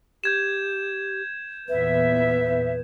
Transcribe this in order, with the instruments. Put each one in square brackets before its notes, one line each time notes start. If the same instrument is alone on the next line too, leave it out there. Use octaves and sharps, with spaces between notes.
[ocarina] G4 [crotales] G6 G#6 E7
[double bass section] E2 A#2 B3 [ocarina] B4 [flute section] E5